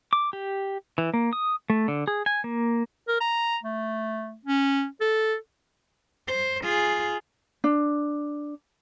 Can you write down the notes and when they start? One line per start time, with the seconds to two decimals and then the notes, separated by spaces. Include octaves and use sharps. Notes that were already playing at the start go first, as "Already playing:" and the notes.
0.13 D6
0.33 G4
0.98 E3
1.14 A#3
1.33 D#6
1.70 A3
1.88 D3
2.08 G#4
2.26 G#5
2.44 A#3
3.08 A#4
3.20 A#5
3.63 A3
4.45 C#4
5.01 A4
6.28 C5
6.63 F4 G#4
7.64 D4